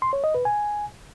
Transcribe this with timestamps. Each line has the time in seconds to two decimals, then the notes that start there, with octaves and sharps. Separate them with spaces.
0.02 C6
0.13 C#5
0.24 D#5
0.34 B4
0.45 G#5